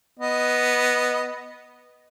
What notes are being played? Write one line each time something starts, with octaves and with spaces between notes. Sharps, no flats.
B3 D#5